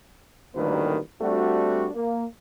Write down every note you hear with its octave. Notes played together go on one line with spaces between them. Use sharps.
A1 D2 D#3 G3 A#3 B4
G3 A3 C4 D4 F#4
A#3